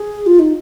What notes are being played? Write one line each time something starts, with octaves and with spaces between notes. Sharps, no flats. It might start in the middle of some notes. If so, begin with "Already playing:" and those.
Already playing: G#4
F4
D#4